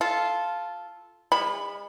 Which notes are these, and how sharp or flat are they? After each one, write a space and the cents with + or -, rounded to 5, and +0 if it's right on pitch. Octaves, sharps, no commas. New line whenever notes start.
F4 -5 A4 -10
G#3 -40 B5 +0